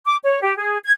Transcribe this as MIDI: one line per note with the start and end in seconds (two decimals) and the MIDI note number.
0.05 0.16 86
0.23 0.42 73
0.42 0.55 67
0.57 0.77 68
0.83 0.91 92